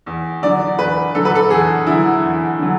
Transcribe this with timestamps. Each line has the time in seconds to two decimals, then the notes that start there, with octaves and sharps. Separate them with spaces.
0.06 E2
0.42 D3 F#3 D5
0.79 E2 B4
1.15 D3 F#3 A4
1.25 B4
1.35 A4
1.50 E2 G#4
1.87 D3 F#3 E4
2.23 E2
2.59 D3 F#3